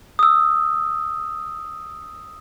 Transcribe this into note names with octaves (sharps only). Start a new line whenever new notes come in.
D#6 E6